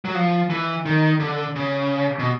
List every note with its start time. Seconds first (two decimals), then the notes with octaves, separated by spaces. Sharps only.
0.05 F#3
0.15 F3
0.50 E3
0.86 D#3
1.20 D3
1.56 C#3
2.19 B2